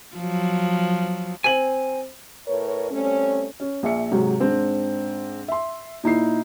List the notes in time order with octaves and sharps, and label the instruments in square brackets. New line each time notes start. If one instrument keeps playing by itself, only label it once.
[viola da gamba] F3 F#3
[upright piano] C4 F#7 [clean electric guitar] G#5
[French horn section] A2 A#4 B4 C#5
G3 A3 C4 C#4
[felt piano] C#4
A#1 E5 C#7
G#2 C3 F#3
G#2 C4 D4
E5 C6
A#2 D#4 E4 C7